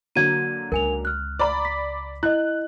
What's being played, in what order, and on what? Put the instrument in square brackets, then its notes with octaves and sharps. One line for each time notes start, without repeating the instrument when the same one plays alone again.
[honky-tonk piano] D3 F#3 A#3 [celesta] G#6 D#7
[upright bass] C#2 [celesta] A#4 G#5 F7
[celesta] F6 F#6
[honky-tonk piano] D5 A#5 B5
[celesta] B6
[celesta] E4 D#5 [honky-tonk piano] F#6